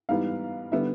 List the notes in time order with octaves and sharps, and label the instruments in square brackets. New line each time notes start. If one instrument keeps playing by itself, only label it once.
[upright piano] G#2 E3 G3 B3 F5
D3 G3 B3 E5